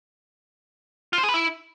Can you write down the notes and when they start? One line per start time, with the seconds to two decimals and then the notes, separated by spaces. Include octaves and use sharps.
1.13 F4
1.18 C5
1.23 G#4
1.29 B4
1.34 E4